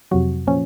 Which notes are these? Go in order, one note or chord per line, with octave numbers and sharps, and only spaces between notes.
F2 C3 F#3 F#4
A#2 F3 C#4